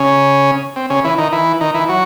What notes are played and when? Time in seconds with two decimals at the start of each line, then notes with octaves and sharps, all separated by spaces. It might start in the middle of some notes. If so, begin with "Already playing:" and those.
Already playing: C#3 C#4
0.76 C4
0.90 C#3 C#4
1.04 E3 E4
1.18 D#3 D#4
1.32 E3 E4
1.61 D#3 D#4
1.74 E3 E4
1.89 F#3 F#4